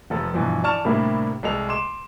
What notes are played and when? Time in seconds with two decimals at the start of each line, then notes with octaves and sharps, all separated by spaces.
0.10 F1 F3 A4
0.34 G2 B2 E3 F3
0.63 E3 D5 A5 C#6 F6 E7
0.85 A2 C3 G3 A#3 D4 E4
1.43 C2 G#3 A4 F7
1.69 C6 D6 E7